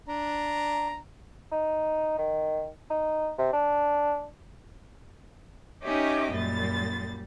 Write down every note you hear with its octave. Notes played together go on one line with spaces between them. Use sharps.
D4 A#5
D#4
D#3
D#4
C3
D4
C#4 D#4 G4 D#5 E5 D6
F#2 A#2 G3 A6